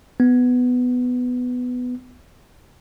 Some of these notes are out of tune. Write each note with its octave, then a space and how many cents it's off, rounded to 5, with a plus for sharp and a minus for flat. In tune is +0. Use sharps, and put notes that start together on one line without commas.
B3 +10